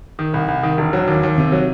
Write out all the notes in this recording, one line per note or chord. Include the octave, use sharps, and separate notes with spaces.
D#3
C2
C2
D#3
E1
F#3
D#2
D#2
C3
F#3